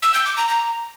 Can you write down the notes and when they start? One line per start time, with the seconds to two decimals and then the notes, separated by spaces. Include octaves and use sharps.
0.02 E6
0.14 G6
0.25 D6
0.37 A#5
0.49 A#5